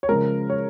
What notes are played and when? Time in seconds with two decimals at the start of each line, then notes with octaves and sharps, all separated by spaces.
0.03 C#5
0.08 C#3 F3 G#3 A#4
0.50 C#5